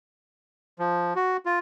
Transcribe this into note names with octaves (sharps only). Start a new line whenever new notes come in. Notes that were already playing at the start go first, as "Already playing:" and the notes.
F3
F#4
F4